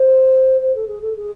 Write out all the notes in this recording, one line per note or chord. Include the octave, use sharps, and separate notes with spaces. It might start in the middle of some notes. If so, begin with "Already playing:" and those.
Already playing: C5
C5
A4
G#4
A4
G#4